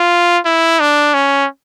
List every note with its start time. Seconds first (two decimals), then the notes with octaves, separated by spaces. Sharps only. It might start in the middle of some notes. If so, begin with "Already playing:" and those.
Already playing: F4
0.45 E4
0.80 D4
1.14 C#4